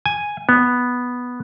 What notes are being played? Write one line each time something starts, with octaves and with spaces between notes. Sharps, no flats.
G#5
B3